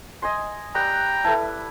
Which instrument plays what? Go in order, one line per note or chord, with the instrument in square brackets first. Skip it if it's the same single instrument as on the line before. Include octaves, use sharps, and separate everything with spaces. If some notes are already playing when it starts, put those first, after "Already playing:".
[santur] D#5 G#5 C6
[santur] G3 B4 E6 [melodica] G5 A#5
[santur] E4 [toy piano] A4 B4 A5